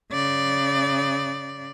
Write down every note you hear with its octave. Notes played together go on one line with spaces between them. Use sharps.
C#3 D5